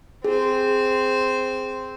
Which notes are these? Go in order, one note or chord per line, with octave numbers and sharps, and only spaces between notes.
C4 G#4 C5